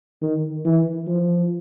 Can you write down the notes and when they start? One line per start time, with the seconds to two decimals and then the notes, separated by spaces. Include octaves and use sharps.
0.22 D#3
0.65 E3
1.07 F3